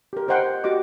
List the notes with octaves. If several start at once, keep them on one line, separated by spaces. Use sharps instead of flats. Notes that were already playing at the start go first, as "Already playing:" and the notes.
G4 A#4
A#4 C5 D#5 F#5 G5 C6
F#4 G4 D#5 D6